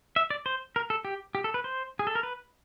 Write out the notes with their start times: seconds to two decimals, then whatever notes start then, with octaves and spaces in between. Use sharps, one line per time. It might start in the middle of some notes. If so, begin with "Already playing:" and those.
0.16 E5
0.30 D5
0.46 C5
0.76 A#4
0.90 A4
1.05 G4
1.35 G4
1.44 A4
1.54 B4
1.64 C5
1.99 G#4
2.07 A4
2.15 A#4
2.23 B4